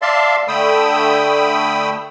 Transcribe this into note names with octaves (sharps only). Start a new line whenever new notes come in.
D5 E5 F5 A5 C6
D3 A3 G5 B5 D#6 E6